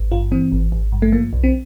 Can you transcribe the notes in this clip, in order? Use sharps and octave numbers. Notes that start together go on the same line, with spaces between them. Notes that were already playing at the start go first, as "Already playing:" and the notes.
Already playing: G#1
G2 F4
E3 C4
G#1
G#1
G2
A3
F3 A#3
B1
C4